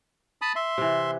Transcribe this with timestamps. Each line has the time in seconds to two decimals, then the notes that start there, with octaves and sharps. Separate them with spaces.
0.42 A5 B5 D#6
0.56 E5 C6
0.78 C3 E3